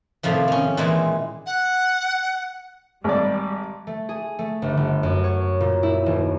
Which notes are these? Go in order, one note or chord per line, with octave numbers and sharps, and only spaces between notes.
A2 C3 D#3 F3
D#3 C#4
A#2 D#3 E3 G#3
F#5
G#1 G3 D5
A3
G#4
A3
G1
G1
F#2
C#5
A#2
E4
D#1